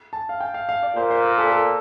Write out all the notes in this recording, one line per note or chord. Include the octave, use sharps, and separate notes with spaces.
A5
F5
G5
F5
F5
D5
A#2 C5
C5
A#4
A4
A4